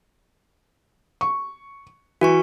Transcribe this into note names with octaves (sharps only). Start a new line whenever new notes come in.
C#6
E3 F#4 B4 C#6